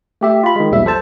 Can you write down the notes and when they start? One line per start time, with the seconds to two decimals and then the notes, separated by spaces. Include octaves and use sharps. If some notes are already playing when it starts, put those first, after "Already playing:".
0.21 A3 G4 E5
0.43 F4 B5
0.56 D#3 G#3
0.71 B1 E2 A#2 G3 E5
0.86 A4 C5 A5